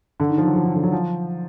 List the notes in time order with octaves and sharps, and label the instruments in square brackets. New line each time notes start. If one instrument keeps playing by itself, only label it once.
[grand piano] D3
D#3
F3
F#3
F3
D#3
D3
F#3
F3